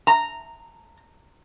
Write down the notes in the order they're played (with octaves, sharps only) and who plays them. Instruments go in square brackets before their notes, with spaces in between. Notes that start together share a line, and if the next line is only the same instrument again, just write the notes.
[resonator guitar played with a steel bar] A#5